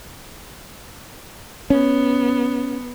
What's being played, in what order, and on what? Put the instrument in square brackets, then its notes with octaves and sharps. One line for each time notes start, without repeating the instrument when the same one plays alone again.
[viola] B3 [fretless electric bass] C#4